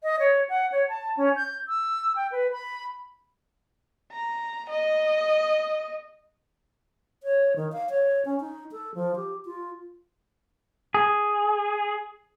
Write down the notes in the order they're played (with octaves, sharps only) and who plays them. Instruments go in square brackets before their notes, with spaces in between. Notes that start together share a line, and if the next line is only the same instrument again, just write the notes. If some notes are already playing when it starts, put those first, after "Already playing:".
[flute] D#5
C#5
F#5
C#5
A5
C#4
G6
E6
G5
B4
B5
[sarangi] A#5
D#5
[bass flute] C#5
D#3
F5
C#5
C#4
D#4
A4
F3
G4
F4
[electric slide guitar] G#4